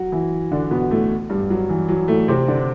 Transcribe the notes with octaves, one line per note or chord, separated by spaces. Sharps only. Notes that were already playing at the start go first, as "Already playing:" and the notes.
Already playing: F#3 F#4
E3 E4
D3 D4
B2 B3
A2 A3
G2 G3
F#3
E3
F#3
A2 A3
C3 C4
D3 D4